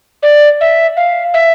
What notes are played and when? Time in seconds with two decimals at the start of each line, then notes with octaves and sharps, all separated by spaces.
0.23 D5
0.61 E5
0.97 F5
1.34 E5